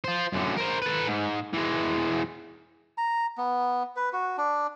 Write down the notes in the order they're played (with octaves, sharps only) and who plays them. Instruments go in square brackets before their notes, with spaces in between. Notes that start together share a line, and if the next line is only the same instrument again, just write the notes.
[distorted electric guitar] F4 C5
F#2 D3
A#4 C5
A4 B4
G#2
E3 G#3
[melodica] A#5
B3
B4
F#4
D4